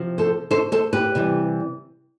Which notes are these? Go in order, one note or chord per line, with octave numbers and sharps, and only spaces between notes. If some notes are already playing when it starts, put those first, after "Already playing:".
Already playing: C3 F3
A4 C5
A4 C5
A4 C5
G4 B4
C3 E3 G3